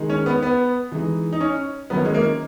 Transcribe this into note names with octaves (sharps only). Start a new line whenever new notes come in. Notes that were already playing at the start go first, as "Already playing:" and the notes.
Already playing: D#3 G#3 D#4
C#4
B3
B3
E3 G#3 D#4
D#4
C#4
D#3 F#3 B3 C#4 E4
G#3
A#3